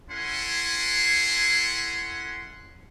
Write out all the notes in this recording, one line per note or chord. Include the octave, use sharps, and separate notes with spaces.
C#4 E4 A4 F#5 G#5 C6